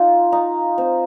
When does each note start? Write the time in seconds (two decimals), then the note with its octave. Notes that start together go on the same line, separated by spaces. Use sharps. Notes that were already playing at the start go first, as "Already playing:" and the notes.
Already playing: D#4 F4
0.32 D#4
0.78 C4